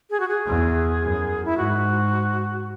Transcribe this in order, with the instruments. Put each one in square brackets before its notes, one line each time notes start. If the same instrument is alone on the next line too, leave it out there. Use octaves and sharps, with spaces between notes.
[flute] G#4
F#4
G#4
[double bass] E2
F#2
[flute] E4
[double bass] G#2 [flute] F#4